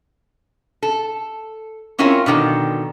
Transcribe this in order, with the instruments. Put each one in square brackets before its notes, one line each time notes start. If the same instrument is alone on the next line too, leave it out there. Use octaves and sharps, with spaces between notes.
[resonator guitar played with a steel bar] A4
C4 C#4 E4 F4 A#4 C#5
B2 D3 D#3 G5